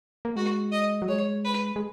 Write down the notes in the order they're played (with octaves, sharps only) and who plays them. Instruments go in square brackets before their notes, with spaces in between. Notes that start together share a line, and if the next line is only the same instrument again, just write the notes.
[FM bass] A#3
[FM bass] G#3 [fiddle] F#4
[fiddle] D#5
[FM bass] F#3
[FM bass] G#3 [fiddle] C#5
[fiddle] B4
[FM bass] G#3